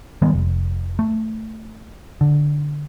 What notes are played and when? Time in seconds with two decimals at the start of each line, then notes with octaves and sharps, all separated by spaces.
0.22 D#3 G3 G#3 B3
0.33 F1
0.99 A3
2.21 D3